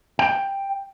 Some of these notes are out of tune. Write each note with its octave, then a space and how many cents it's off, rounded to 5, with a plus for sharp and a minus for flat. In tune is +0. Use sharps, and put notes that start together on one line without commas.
G5 +10